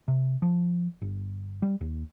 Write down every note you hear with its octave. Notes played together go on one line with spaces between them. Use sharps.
C3
F3
G1
G3
D#2